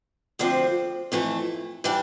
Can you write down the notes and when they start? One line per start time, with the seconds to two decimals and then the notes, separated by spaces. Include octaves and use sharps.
0.39 D2 D3 F3 C4
1.12 F2 E3 A3
1.84 E3 G3 D4